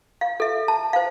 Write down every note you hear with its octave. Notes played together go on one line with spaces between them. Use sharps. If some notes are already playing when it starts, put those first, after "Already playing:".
F5
A4 E5
A5
C5 F5